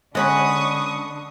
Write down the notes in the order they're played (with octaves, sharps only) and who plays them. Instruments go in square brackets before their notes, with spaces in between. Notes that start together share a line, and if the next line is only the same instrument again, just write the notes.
[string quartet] D3 D4 [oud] G#3 C#4 [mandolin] F#5 B5 [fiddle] C#6 D#6